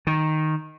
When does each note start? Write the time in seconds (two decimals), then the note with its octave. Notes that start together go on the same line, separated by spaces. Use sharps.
0.07 D#3